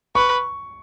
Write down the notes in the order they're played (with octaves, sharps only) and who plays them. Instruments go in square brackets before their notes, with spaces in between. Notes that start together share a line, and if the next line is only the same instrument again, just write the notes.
[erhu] B4 [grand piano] C#6